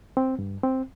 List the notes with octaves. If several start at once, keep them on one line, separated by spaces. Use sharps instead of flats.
C4
G2
C4